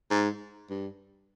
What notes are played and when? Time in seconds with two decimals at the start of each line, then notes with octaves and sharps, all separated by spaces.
0.11 G#2
0.70 G2